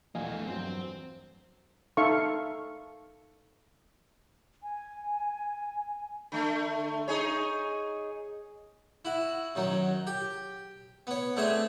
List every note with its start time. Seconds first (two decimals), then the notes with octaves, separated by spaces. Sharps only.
0.15 A#1 E2 A3 A#3 D#5 F5 G#5
0.47 G2 F#3 C4
1.97 D#4 A4 E5 F5 C#6
4.63 G#5
6.32 D3 A3
7.08 D#4 G#4 C#5
9.05 E4 F#4
9.55 F#2 D#3 F#3
10.07 G4
11.07 B3 C#5
11.36 A3 C4 D4 G#4 E5 G#5